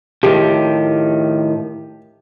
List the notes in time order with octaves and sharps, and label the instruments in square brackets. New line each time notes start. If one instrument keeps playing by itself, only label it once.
[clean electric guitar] A2 D#3 F3 [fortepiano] G4